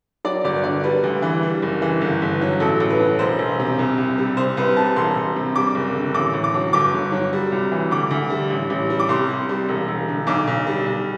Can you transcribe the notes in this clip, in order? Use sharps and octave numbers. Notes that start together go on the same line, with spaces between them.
F#3 D5
G1 D5
D3 D5
G3 B4
D2
E3
G3
F#1
E3
G1
G1
F#3
A1 A4
A1
B4
F#3
E1 C5
E1
C3
C2
C2
G3
C2 C5
C2 B4
G3 A5
E1 C6
E1
C3
G3 D6
F#1
D3
A1 D6
A1
D6
F#3
G1 D6
G1
F#3
G3
C2
E3
D2 D6
D2
G3
A1
A1
G3
D6
C2 C6
C2
G3
E1
E1
D3
B1 D6
B1
G3
B1